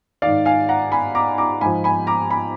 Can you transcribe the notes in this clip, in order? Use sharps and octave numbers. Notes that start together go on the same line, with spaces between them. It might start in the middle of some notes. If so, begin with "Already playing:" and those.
G#2 D#3 D5 F5
F5 G#5
F#5 A#5
G#5 B5
A#5 D6
A#5 D6
G#2 F3 G#5 B5
G#5 B5
A#5 D6
G#5 B5